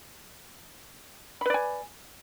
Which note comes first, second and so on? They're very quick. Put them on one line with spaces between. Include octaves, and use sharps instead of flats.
B5 B4 D5 G#5